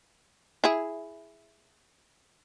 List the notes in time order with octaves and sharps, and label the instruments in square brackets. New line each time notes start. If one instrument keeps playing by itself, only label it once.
[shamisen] E4 G#4